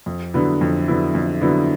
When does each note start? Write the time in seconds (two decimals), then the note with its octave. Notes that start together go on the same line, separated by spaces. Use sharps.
0.06 F2
0.34 D3 F#3 B3 E4
0.61 F2
0.88 D3 F#3 B3 E4
1.15 F2
1.41 D3 F#3 B3 E4